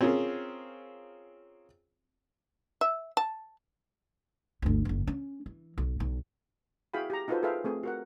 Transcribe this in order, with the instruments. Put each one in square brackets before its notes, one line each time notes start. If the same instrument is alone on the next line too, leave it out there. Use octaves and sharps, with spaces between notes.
[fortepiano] C4 C#4 F4 G#4 A#4
[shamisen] E5
A5
[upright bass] G1 D2
F#1 E2
C#4
E3
B1
B1
[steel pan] E4 F#4 G#4 F5 G5 B5
G4 A#5
D#4 F4 F#4 A4 B4 C5
G#4 A4 B4 E5 F5 G5
A3 C4 G#4
F#4 A#4 F#5